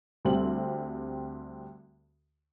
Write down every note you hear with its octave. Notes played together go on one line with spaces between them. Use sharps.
D2 G3 C4 F#7